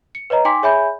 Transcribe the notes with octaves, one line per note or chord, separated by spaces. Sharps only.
C#7
B4 C#5 D#5 A#5
D#4 G5 G#5 C6 D6 B6
G#4 C#5 E5 G#5 B5 G6